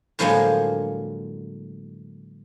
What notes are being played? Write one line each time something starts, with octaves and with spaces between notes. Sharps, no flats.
A2 D3 F3 F#3 G#3 A#3